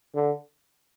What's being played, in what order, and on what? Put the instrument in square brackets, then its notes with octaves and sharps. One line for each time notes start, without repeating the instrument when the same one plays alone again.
[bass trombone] D3